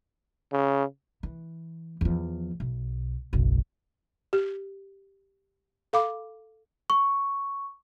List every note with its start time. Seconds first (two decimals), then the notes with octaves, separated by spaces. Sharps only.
0.53 C#3
1.23 E3
2.01 E2 F3
2.60 B1
3.33 F#1 B1
4.33 G4
5.93 A4 F5 B5 D6
6.90 C#6